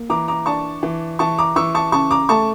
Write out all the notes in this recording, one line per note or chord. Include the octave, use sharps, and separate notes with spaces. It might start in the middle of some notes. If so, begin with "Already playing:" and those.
Already playing: A#3
E3 A#5 D6
A#5 D6
D4 A5 C#6
E3
E3 A5 C#6
A#5 D6
E3 C#6 E6
A5 C#6
C#3 A5 C#6
A#5 D6
A3 A5 C#6